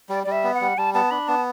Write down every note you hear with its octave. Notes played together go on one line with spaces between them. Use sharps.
G3 D5
G3 D5
E5
B3
F#5
G3
G3 A5
B3 A5
D4 B5
B3 A5